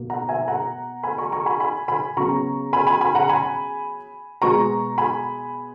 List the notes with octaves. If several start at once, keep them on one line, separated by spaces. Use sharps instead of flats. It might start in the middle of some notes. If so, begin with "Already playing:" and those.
Already playing: B2 A#3
F#5 A#5
E5 G#5
F#5 A#5
G#5 B5
A#5 C#6
A#5 C#6
G#5 B5
G#5 B5
G#5 B5
C#3 F#3 B3 A#5 C#6
G#5 B5
G#5 B5
G#5 B5
F#5 A#5
G#5 B5
B2 G#3 B3 A#5 C#6
G#5 B5